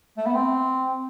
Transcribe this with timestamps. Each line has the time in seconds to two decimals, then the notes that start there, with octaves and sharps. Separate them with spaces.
0.18 A3
0.26 B3
0.35 C4